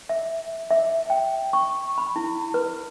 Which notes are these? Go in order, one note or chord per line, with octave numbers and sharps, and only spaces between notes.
E5
E5
G5
C#6
B5
E4
B4